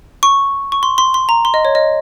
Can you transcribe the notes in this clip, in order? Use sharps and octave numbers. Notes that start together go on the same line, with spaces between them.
C#6
C#6
C6
C6
C6
A#5
C6
D#5
C#5
D#5